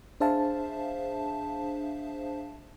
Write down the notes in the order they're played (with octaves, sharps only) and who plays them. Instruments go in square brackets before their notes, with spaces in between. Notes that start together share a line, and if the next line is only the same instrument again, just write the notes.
[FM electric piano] D4 G#4 C5 E5 F5 A5